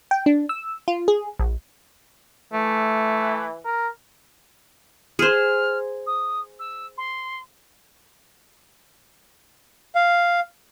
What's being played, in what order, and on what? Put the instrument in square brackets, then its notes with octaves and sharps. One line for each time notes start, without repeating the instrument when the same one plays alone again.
[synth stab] G5
D4
E6
F4
G#4
A#1
[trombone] E3 [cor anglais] A3
[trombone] A#4
[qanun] G#4 C5 [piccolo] F6
[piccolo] D#6
E6
C6
[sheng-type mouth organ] F5